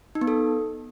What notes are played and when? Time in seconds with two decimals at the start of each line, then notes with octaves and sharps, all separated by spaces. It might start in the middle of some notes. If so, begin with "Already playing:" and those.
0.15 D#4
0.21 B3
0.28 A4